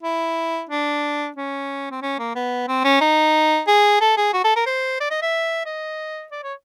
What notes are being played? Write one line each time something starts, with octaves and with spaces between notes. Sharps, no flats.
E4
D4
C#4
C4
C#4
A#3
B3
C4
C#4
D#4
G#4
A4
G#4
F#4
A4
A#4
C5
D5
D#5
E5
D#5
D5
C#5